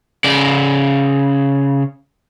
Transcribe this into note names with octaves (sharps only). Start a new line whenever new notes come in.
C#3 D5